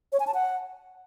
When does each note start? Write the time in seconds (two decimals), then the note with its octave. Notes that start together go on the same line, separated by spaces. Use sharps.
0.13 C#5
0.20 G#5
0.27 A5
0.34 F#5